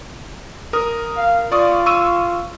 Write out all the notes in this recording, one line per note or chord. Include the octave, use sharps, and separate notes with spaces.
A#4 D#6
F5
F4 D5 C#6 D#6
C#6 E6 D#7